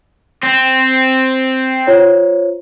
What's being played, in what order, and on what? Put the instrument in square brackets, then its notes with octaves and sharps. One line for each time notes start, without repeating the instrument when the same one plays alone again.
[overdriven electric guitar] C4
[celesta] F4 C5 C#5